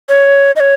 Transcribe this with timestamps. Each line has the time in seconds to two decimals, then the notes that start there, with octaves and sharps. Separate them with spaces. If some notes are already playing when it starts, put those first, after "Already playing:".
0.09 C#5
0.56 D#5
0.60 C#5